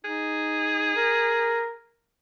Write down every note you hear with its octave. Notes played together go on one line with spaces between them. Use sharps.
D#4 G#4
A#4